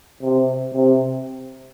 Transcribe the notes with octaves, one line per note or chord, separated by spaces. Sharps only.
C3
C3